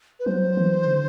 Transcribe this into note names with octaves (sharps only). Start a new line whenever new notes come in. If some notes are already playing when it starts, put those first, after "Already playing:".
B4
F#3 C5
E3
D3